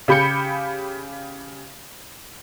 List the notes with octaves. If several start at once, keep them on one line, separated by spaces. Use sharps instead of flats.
C#3 G4 B5 G6 C#7